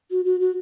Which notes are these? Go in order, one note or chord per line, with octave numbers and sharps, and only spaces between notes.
F#4
F#4
F#4